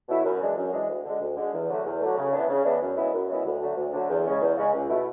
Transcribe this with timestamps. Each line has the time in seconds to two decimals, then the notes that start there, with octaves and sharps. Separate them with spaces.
0.09 B2 F#3 A3 E4
0.24 F#2
0.40 E3 G#3 D4
0.57 F#2
0.73 E3 G#3 D4
0.89 D2
1.05 D3 G#3
1.21 D2
1.37 D3 G#3
1.53 E2
1.69 D3 F#3 A3
1.85 E2
2.01 D3 F#3 A3
2.18 C#3
2.33 E3 B3 D4
2.49 C#3
2.65 E3 B3 D4
2.81 F#2
2.97 C#3 G#3 B3 E4
3.14 F#2
3.29 C#3 G#3 B3 E4
3.45 D2
3.61 D3 F#3 A3
3.77 D2
3.93 D3 F#3 A3
4.10 E2
4.26 C#3 G#3 C#4
4.42 E2
4.57 C#3 G#3 C#4
4.73 C#2
4.89 B2 A3 E4